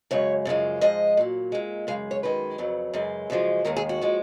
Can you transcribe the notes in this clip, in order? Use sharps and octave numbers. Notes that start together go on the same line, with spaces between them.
F#2 C#3 G#3 C#5
F#2 C#3 F3 G#3
G#2 F3 G#3 D#5
A#2 F#3
A#2 G#3
F#2 C#3 G#3 F5
C#5
F#2 D#3 G#3 B4
F2 C#3 F#3
F#2 C#3 G#3
F#2 C#3 F3 G#3
D#2 D#3 G#3 A#4
G#4
F#4
F3 G#3